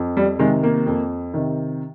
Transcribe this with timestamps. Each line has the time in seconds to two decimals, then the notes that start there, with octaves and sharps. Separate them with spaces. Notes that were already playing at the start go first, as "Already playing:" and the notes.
Already playing: F2
0.17 G3
0.39 C3 D#3 G#3
0.63 A#3
0.86 F2
1.34 C3 D#3